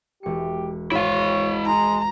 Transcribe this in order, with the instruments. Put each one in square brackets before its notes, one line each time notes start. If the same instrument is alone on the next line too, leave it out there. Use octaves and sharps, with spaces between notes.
[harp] E1 C#7 [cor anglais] G4
[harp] G#1 G#4 [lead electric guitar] E4 F5 [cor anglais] C#5
[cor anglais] G#3 [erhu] A#5